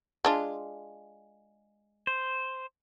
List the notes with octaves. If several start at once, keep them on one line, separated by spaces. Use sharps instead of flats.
G#3 D4 F4
C5